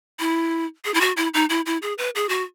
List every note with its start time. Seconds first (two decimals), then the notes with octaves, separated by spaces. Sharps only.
0.20 E4
0.85 G#4
0.94 E4
1.01 F#4
1.17 E4
1.34 D#4
1.49 E4
1.66 E4
1.82 G#4
1.98 B4
2.15 G#4
2.29 F#4